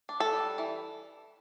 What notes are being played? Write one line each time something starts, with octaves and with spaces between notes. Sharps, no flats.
D4
A4
G3
E3